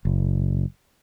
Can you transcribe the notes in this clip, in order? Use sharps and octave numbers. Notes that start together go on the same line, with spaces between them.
F#1